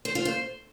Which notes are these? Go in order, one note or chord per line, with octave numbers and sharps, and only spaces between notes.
C5
F4
C5